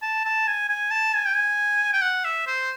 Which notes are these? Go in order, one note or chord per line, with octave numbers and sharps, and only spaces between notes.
A5
A5
G#5
G#5
A5
G#5
G5
G#5
G5
F#5
E5
C5